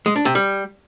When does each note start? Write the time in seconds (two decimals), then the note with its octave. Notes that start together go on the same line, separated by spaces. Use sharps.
0.06 G#3
0.16 D4
0.25 C3
0.35 G3